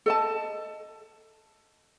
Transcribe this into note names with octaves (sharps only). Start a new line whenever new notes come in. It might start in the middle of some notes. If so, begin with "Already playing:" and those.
A4 D#5 A5